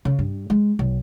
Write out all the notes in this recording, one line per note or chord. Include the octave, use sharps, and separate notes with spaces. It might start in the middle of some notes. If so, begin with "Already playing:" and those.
C#3
G2
G#3
B1